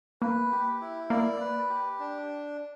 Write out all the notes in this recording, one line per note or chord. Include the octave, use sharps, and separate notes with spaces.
A#3 B4
G4
E4
A#3 D5
B4
G4
D4